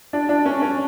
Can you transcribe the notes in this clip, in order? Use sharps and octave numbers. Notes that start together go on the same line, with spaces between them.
D4
D4
C#4
C#4